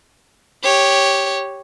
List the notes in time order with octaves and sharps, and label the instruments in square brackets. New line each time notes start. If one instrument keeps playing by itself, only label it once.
[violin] G4 C#5